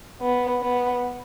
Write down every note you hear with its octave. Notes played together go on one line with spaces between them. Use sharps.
B3
B3